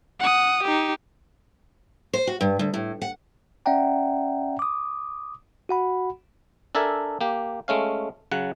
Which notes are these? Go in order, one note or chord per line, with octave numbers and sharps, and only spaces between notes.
F#5 D#6
D#4 G4
C5
F#4
G2
D2
A2
F#5
C#4 D5 E5 F#5 G5 A#5
D6 D#6
F#4 F#5 B5
D4 A4 A#4 E5 G#5
A#3 G4
G#3 A3 C#4 F5
C#3 F#3 F#5